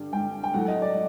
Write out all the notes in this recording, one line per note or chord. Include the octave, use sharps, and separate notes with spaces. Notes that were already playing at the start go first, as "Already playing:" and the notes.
Already playing: G2 D3 G3
G2 D3 G3 G5
G5
A2 F#3 A3 F#5
D#5
D5